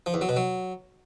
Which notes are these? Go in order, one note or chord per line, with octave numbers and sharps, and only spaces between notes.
F3
E2
F#3
B2
F#3